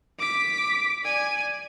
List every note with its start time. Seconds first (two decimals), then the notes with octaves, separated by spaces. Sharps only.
0.19 D6 B6
1.03 D5 G#5